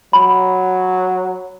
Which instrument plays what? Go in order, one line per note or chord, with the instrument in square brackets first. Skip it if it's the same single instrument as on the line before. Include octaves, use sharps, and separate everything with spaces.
[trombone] F#3 [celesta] B5